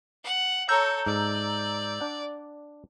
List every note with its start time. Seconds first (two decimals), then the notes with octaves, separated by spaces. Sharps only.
0.24 F#5
0.69 A4 C#5 A#5 E6 G6
1.06 G#2 D5
2.00 D4 F#5